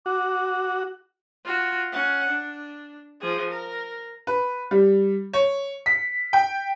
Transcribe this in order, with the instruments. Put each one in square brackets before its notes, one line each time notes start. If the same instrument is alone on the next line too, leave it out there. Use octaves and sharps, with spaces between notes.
[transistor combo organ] F#4 [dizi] D6
[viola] F4 F#4
C#4 F#5
D4
F3 G#4
A#4
[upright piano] B4
G3
C#5
B6
G5